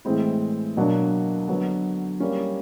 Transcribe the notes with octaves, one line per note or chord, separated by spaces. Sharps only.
A2 E3 G#3 C4 E4
B2 F#3 A#3 D4
D3 F#3 B3
G3 A#3 C#4